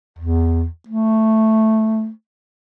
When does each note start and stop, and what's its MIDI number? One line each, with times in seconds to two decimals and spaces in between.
0.18 0.66 40
0.88 2.10 57